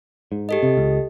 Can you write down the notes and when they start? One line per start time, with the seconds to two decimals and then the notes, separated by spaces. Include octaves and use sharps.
0.32 G#2
0.49 G4 A4 D#5
0.63 C3
0.77 C#2